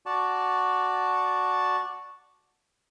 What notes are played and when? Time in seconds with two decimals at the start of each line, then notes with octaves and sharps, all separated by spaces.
0.06 F#4 D5 A5